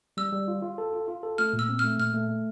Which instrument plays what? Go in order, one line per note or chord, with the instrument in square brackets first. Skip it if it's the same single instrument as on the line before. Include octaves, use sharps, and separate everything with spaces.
[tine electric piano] G3 [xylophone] E6
[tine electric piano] G3
F4
F4
A4
F4
F4
A4
[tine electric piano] A3 [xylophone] F6
[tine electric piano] A#2
[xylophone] E6
[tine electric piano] C4
[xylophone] F6
[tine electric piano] A3
[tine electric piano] A#2 [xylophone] F6
[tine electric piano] A3
A3